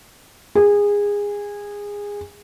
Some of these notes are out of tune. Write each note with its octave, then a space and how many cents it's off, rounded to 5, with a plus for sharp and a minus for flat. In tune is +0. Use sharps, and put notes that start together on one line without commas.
G#4 -20